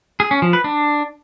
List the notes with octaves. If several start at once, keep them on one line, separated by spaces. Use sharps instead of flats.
G#4
C#4
F3
B4
D4